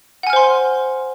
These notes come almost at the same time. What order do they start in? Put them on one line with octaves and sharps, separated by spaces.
F#5 G#5 F6 C5 C6